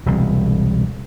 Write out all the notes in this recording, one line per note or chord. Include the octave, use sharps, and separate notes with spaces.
E1 C2